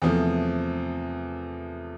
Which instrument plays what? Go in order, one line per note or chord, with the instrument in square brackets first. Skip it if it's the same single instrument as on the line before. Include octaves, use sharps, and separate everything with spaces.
[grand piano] E2 C3 F3 A3